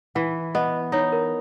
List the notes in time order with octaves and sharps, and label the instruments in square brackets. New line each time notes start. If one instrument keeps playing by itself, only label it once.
[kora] E3 [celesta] F#5
[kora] B3 [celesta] D#5
[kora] D#4 [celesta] C#5
[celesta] A#4